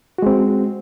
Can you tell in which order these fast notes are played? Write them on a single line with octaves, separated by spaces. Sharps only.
F#4 G#3 C4